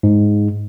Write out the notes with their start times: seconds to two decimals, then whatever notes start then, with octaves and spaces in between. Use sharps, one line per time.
0.03 G#2